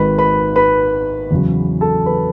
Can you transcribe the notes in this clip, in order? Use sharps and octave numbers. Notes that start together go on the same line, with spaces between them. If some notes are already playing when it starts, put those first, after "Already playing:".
Already playing: G#1 G#2 D#3 B4 B5
B4 B5
B4 B5
E2 C#3 F#3
A4 A5
B4 B5